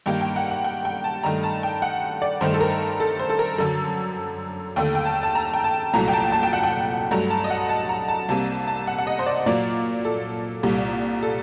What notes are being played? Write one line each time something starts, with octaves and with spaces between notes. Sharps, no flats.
G2 D#3 G3 A#3 G5
G5
F#5
F#5
G5
G5
A5
G2 D#3 A3 A#5
A5
G5
F#5
D5
G2 D#3 A3 C5
A4
A#4
A4
C5
A4
A#4
F#2 D3 F#3 A4
D#2 D3 A3 G5
G5
A5
A5
A#5
G5
A5
C2 A#2 F#3 A3 A#5
G5
A5
A5
G5
F#5
G5
G2 F#3 A3 A#5
A5
D#5
F#5
A5
A#5
A5
C2 C3 G3 A#3 A5
A5
F#5
F#5
D#5
C5
D5
A#2 F#3 A#3 D5
A4
C2 A#2 G3
A4